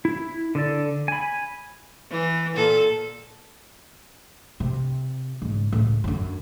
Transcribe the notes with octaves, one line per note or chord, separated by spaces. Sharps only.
E4
D3 A4 D5
G#5 B5
E3
A#2 A4
C3
G#2 C#3
C#2 A2
F#2 D3